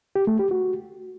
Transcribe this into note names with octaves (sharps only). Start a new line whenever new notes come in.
G4
A3
G4
F#4